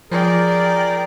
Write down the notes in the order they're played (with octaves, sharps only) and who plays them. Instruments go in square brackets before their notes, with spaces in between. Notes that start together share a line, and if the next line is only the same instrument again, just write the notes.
[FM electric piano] F3 [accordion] G#4 A#4 [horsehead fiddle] D5 G5